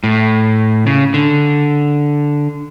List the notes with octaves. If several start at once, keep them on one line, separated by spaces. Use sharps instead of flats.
A2
C#3
D3